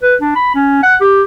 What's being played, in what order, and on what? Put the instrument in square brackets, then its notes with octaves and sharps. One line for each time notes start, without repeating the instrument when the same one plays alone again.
[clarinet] B4
D4
B5
C#4
F#5
G4